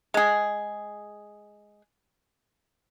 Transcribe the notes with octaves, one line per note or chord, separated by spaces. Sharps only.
G#3 G#4